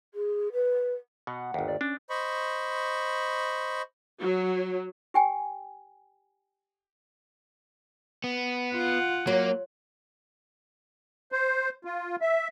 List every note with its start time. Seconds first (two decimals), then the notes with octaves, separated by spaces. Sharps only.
0.14 G#4
0.52 B4
1.27 B2 F#5
1.54 G1 D#2
1.68 D5
1.81 C#4 D4
2.10 C5 D#5 B5 C#6
4.19 F#3
5.14 G4 G5 G#5
8.24 B3
8.73 F4 F#5
9.27 F#3 A#3
11.32 C5
11.85 F4
12.21 E5